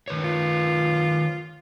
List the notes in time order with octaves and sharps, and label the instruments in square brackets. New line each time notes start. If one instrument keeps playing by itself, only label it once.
[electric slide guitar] D#3 B4 C#5
[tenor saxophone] F4